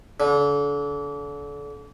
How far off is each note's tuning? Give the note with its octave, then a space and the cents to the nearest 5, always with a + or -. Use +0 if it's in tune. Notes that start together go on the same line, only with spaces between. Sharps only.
D3 -35